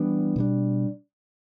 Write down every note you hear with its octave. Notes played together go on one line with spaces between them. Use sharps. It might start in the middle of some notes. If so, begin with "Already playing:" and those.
Already playing: E3 G3 B3 D4
B2 G3 D4